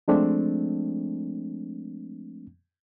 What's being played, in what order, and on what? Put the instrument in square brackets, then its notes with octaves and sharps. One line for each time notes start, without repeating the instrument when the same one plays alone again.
[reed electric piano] F3 G#3 A3 C4 D4